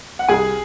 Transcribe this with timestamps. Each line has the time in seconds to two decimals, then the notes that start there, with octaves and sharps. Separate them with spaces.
0.19 F#5
0.29 C2 G#4 G#5